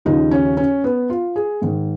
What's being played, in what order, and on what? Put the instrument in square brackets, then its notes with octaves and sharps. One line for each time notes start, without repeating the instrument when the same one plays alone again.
[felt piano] D#2 C#3 F3 D#4
C#4
C#4
B3
F4
G#4
G#2 D#3